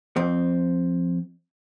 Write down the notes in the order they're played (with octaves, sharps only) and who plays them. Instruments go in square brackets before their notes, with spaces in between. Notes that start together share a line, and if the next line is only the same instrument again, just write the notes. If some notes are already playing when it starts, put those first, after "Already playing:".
[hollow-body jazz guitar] F2 C4